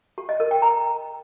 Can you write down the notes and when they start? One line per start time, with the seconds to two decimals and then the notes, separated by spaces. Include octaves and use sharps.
0.18 G4
0.29 D#5
0.40 A#4
0.51 G5
0.62 A#5